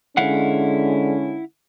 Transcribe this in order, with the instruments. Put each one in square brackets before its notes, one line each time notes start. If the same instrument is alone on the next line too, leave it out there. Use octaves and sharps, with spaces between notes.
[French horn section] D3 G#3 C#4 [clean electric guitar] E4 F5 F#5